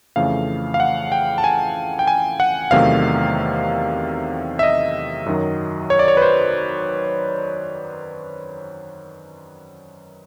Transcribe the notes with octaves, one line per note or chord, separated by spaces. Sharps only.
F2 C#3 E3 A3 F5
F5
F#5
G5
A5
G#5
G5
G#5
F#5
E2 C3 D#3 F#3 A3 F5
E5
D#5
F#2 D#3 F#3
C#5
D5
C#5
B4
C5